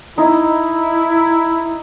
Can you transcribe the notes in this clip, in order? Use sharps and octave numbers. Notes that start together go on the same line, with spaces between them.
D#4 E4